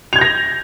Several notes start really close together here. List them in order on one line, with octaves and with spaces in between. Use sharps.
F7 G#6 G6 A#6